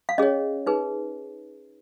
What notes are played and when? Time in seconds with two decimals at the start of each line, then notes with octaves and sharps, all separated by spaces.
0.09 F5
0.18 C#4 G#4 C#5 D#5
0.66 D#4 G#4 B4